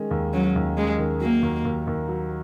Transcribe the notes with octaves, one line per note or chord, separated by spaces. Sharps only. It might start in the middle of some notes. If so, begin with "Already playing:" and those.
Already playing: D#3 G#3 C#4
D#2
F#3 C#4
D#2
G#3 C#4
D#3
F#3 A#3
D#2
D#2
D#2
F#3